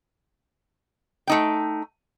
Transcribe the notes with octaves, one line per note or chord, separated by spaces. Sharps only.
A3 D#4 G5